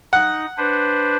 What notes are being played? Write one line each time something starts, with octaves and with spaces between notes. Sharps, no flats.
D#4 F#5
D4 B4 C5